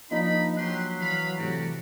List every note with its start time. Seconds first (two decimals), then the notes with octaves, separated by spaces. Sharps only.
0.11 F3 A#3 D4 D#4 D#5 B5
0.57 F#3 G4 B4 C6 F#6
1.00 E3 F5 B5
1.38 A2 C3 A3 F#4 G4 D5